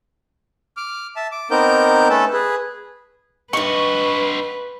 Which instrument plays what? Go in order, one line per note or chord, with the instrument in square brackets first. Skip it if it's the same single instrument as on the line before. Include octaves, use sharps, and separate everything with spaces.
[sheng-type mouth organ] D6 F6
E5 A5
D6
B3 C4 D#4 A#4 D6 G6
A3 C#4 A4 B4 A5
G#4 B4
[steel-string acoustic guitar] G2 D#5 [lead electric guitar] C4 F#4 [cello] B4 [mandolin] C#6